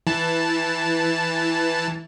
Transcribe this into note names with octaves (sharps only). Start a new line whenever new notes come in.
E3 A5